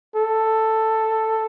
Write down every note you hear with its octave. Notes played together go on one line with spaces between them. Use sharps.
A4